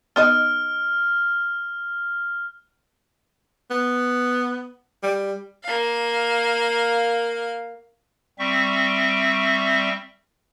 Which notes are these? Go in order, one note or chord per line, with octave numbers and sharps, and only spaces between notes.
B3 D#4 D#5 F6
B3
G3
A#3 F5
G3 C4 E5 C#6